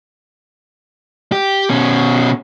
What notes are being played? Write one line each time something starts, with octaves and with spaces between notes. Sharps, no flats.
G4
B2 C#4